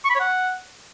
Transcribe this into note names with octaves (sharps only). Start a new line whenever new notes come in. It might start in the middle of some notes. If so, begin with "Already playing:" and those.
C#6
B5
C#5
F#5